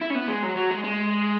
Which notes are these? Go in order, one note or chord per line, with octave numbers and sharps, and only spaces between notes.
E4
C#4
B3
G#3
F#3
F#3
G#3
G#3